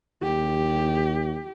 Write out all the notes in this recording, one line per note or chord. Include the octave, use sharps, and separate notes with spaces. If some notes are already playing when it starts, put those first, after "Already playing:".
D#2 G4